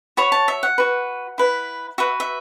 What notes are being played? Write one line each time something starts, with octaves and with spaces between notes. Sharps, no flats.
F#4 C#5 B5
A5
E5
F#5
F#4 B4
E4 B4
F#4 B4 E5
E5